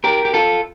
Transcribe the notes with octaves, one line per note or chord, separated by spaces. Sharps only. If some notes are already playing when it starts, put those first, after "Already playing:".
G4 A#4
G4
F4 A4